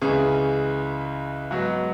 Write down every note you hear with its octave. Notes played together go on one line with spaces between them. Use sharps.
C#2 C#3 E3 G#4
G#2 F#3 B3 F#4